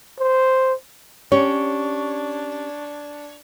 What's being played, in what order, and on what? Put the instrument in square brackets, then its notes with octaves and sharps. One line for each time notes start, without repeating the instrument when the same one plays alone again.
[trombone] C5
[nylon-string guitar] C#4 G4 [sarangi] D4 [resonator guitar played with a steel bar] C#5